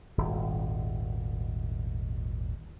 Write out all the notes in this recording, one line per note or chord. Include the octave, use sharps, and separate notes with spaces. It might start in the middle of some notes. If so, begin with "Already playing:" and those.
D#1 G#1